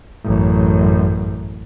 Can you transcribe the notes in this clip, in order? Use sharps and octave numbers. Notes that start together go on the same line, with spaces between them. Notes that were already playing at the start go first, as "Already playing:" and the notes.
A1 F#2